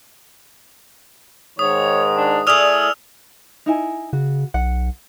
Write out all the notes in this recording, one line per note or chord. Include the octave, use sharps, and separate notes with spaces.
G#2 D#3 C#5 D#6
D4
A3 E4 G#4 D5 E6 F6 F7
D#4 E4 G#5
C#3 F#4
B1 F#5